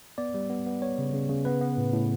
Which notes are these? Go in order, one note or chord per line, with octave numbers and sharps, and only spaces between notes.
B3 D5
G3
B3
B3
B3 C#5
C#3
C#3
C#3
B3 B4
B3
A2
A2